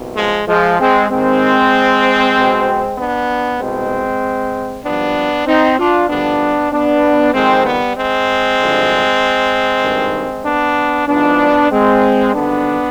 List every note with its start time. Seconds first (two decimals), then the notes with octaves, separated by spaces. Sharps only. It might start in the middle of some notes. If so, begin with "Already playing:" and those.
Already playing: C2 B2
0.16 F3 G#3
0.48 F3 G#3
0.80 G#3 C4
1.11 D#2 D#3 G#3 C4
2.36 B1 B2
2.97 B3 D4
3.59 C2 B2 G#3 C4
4.85 G#1 G2 F3 B3 D4
5.47 C4 D#4
5.79 D4 F4
6.09 G#1 G2 D3 F3 B3 D4
6.72 B3 D4
7.34 F2 D#3 G#3 C4
7.66 G3 B3
7.97 G#3 C4
8.59 G#1 G2 D3 F3
9.83 G#1 G2 D#3
10.46 B3 D4
11.08 G#1 G#2 F3 B3 D4
11.71 G#3 C4
12.34 G#1 G2 D3 B3 D4